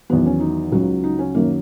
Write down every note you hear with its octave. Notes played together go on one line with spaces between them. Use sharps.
E2 D#3 F#3 B3
C#4
D#4
C#2 C#3 F#3
D#4
C#4
F#2 D#3 F#3 A#3